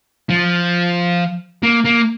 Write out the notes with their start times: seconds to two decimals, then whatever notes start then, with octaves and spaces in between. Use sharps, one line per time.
0.30 F3
1.63 A#3
1.85 A#3